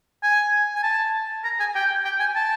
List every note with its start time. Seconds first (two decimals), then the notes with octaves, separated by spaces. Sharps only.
0.23 G#5
0.75 G#5
0.83 A5
1.44 A#5
1.60 G#5
1.75 G5
2.05 G5
2.20 G#5
2.36 A5